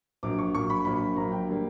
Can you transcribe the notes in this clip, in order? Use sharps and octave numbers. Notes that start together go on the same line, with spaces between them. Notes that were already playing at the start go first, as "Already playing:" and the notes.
A#1 A#2 F#3 D6
C#6
A#1 A#2 F#3 C#6
B5
A#1 A#2 F#3 B5
A#1 A#2 F#3 A#5
G5
D3 G3 A#3